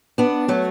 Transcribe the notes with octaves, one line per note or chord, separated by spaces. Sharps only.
B3 D4
F#3 A3